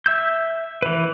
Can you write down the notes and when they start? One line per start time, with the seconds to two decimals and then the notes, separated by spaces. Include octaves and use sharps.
0.06 E5 E6 G6
0.82 E3 B4